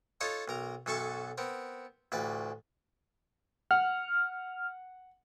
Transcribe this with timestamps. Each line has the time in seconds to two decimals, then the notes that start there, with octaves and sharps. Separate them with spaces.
0.21 D#4 F4 A4 C#5 D#5 A5
0.48 B1 A#4 A#5
0.86 B1 F#2 A4 E5 A5 C#6
1.38 B3 C4 A#4
2.12 A1 D2 B4 D5
3.71 F#5 F6